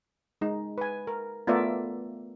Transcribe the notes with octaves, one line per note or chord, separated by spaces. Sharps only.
G#3 D#4
B4 G#5
A#4
A3 B3 F4 A#4 D5 E5